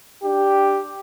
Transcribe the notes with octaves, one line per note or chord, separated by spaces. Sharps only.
D4 G4